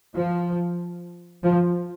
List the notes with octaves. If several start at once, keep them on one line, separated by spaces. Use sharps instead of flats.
F3
F3